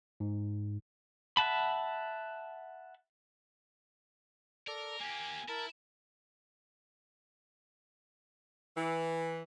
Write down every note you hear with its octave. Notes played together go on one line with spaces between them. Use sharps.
G#2
E5 F#5 A5 B5
A4 A#4 D5
A#3 G4 G#5
E4 A#4 A5
E3